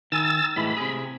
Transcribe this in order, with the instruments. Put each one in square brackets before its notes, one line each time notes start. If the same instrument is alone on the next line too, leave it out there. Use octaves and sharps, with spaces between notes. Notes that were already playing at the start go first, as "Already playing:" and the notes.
[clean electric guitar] D#3 G#5 [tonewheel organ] E6 A6
[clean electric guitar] A2 E3 G#3 [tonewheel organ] B5
[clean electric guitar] C3 G#4